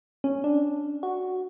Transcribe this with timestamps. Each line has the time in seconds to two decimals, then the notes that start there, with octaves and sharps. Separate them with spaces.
0.24 C#4
0.44 D4
1.03 F#4